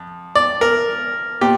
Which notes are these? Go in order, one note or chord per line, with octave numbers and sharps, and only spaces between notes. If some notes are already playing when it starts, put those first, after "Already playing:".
Already playing: F2
D5
A#4
A#2 G4